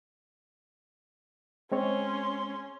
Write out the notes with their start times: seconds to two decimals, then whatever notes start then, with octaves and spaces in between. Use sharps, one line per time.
1.72 G#3 C4 C#4 C#5 C6